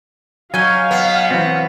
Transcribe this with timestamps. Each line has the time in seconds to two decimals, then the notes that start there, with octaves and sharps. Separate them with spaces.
0.54 F#3 C#4 D#4 F5 G#5
0.91 B3
1.31 E3 F#3 C4